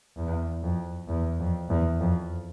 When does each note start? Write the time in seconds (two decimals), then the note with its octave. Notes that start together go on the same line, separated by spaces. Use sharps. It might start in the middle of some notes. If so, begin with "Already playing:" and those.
0.17 E2
0.63 F2
1.08 E2
1.39 F2
1.70 E2
2.00 F2